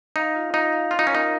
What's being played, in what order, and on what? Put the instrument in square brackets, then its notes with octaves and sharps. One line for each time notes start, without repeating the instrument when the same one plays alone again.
[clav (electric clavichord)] D#4 [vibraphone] F5
[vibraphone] F4
[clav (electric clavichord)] D#4 [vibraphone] F5
[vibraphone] F5
[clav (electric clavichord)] F4 [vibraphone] F5
[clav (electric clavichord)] D#4
C#4
[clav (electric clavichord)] D#4 [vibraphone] A#4